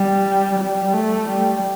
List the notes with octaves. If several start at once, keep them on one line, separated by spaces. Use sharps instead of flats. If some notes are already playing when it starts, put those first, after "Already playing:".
Already playing: G3
G3
A3
G3